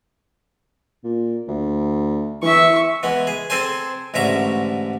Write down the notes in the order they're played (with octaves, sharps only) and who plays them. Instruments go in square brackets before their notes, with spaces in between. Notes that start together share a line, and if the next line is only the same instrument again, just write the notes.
[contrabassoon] A#2
D2
[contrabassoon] E3 [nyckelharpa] E5 C#6
[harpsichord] E3 G#3 B3
G#4
C4 G#4 A4 C5 G#5
A1 G#2 D3 E5 A#5 C#6